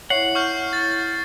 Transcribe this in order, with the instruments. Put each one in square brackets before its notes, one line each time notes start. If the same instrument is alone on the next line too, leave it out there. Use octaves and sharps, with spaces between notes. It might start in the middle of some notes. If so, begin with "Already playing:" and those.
[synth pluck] E4 C#5 [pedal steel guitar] F#5 [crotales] C7
[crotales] C#6 F6 G6
A6